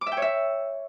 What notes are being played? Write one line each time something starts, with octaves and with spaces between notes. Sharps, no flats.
D6
E5
G5
C#5
E5